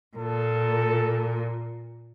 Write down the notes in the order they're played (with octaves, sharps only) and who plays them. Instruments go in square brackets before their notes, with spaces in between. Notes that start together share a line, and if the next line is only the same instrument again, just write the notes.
[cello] A#2 [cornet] A4